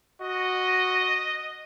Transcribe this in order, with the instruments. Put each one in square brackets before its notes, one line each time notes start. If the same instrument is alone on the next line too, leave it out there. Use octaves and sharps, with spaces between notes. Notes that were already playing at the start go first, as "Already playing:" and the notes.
[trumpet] F#4 [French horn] D#5